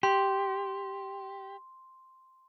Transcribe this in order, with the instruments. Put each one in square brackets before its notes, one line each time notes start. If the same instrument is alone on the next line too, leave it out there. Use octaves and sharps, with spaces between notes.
[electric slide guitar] G4 [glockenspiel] C6